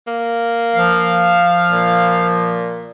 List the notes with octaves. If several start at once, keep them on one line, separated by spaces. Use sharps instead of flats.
A#3
F3 F5
A#2